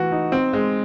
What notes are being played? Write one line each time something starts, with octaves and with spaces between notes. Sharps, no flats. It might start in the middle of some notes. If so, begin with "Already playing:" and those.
Already playing: E3 A3 F#4
D#4
C4
G#3